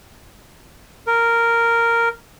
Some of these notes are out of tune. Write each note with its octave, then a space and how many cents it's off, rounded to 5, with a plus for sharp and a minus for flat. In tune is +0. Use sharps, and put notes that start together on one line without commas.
A#4 -5